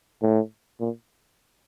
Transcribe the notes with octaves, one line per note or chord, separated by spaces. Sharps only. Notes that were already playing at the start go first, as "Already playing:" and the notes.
A2
A#2